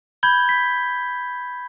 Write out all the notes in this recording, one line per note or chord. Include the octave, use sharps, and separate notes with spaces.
B5 G6 G#6 G7
B6